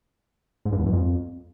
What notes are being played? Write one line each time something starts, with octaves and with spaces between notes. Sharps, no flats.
G#2
G2
E2
F#2
F2